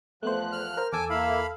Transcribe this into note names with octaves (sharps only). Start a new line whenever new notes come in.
E2 F3 A3 B3 C5 F#6
F6
A#4 C5
E2 A4 G#5 D6 E6
A#3 E4 F5 B5